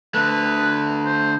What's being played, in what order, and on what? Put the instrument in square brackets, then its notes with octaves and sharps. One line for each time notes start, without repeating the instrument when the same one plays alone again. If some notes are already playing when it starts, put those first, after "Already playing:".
[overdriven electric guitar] D3 A3 [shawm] B4
[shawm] C5